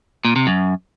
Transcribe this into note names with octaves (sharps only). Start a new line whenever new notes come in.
A#2
C3
F#2